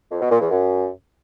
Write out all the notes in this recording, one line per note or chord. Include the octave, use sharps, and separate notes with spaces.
F2
B2
A#2
E2
F#2